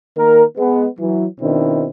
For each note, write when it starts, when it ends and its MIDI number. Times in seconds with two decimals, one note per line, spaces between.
0.17 0.44 51
0.17 0.44 58
0.17 0.44 70
0.58 0.86 56
0.58 0.86 59
0.99 1.26 52
0.99 1.26 54
1.41 1.88 47
1.41 1.88 51
1.41 1.88 60
1.41 1.88 62
1.41 1.88 64